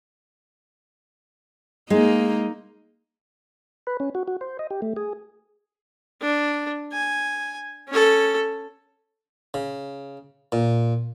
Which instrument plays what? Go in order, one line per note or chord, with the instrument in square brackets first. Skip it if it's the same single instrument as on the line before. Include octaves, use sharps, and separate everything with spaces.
[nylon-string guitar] G#3 [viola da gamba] A#3 D#4
[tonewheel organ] B4
C#4
F#4
F#4
C5
D#5
G4
A3
G#4
[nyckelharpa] D4
G#5
C#4 A4
[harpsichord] C#3
A#2